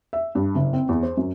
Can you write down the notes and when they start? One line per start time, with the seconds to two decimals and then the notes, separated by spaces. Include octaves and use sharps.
0.13 E5
0.35 G2
0.55 F#1
0.73 C4
0.89 E2
1.03 C5
1.17 F#2